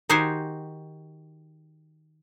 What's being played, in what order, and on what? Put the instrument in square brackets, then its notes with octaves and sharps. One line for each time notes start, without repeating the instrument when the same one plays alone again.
[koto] D#3 D#4 F#4 G4 C5 G#5